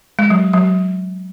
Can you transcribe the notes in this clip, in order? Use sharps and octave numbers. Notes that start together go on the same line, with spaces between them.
G#3
F#3
F#3